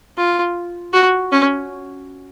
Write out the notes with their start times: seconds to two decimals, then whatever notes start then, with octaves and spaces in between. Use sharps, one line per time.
0.17 F4
0.93 F#4
1.32 C#4